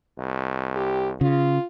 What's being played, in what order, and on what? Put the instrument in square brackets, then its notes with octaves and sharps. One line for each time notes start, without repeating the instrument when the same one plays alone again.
[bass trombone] C2
[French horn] G4
[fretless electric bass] C#3 [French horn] F4